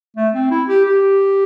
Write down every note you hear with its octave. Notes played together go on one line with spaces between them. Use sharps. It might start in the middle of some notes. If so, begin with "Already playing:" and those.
A3
C4
E4
G4
G4